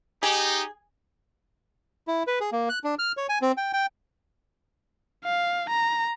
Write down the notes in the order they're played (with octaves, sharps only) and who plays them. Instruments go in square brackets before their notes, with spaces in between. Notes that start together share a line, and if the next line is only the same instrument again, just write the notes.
[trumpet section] D#4 G4 [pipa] G#4
[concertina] E4
B4
G#4
A#3
F#6
D4
F6
C#5
G#5
C4
G5
G5
[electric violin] F5
A#5